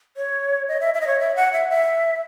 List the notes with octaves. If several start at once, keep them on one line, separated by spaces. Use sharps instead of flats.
C#5
D#5
E5
E5
D#5
C#5
E5
F#5
E5
E5